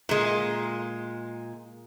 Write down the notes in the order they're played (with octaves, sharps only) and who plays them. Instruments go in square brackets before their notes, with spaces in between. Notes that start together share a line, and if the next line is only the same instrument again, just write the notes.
[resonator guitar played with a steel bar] A#2 G#3